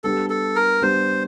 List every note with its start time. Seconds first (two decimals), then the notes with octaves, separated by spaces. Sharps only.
0.04 G3 B3 D4 G4 A4
0.30 A4
0.56 A#4
0.82 G3 B3 D4 G4 C5